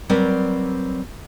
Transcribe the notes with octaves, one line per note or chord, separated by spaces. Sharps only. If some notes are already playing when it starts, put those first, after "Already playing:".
F#3 G3 C4 A#4 B4 D5